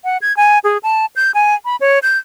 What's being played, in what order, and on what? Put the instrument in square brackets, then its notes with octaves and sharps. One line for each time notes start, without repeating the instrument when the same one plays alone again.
[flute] F#5
G#6
G#5
G#4
A5
G6
G#5
B5
C#5
G6